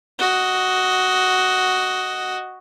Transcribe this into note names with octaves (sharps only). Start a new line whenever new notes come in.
F#4 D#5